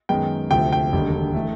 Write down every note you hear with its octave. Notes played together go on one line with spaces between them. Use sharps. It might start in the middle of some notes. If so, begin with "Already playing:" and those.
F#2 D#3 G#3 B3 G5
D2 C3 F3 A3 G5
G5
E1 D#2 D3 G3
E3 A3